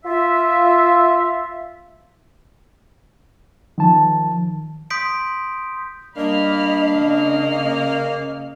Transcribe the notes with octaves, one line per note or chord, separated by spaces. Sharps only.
F4 E5
D#3 F3 A5
C6 D#6 G6 B6 D7
G3 A#3 D4 D#5 B5 F6
C#3 C#4 F6